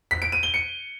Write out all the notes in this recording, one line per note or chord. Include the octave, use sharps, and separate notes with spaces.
B6
D7
D#7
G7
C#7